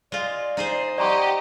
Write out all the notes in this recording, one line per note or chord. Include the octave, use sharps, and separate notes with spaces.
G#3 F4 D5
D#4 G#4 C5
G4 D5 D#5 F#5 A#5 C6 C#6